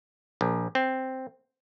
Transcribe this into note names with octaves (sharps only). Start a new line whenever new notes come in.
A#1
C4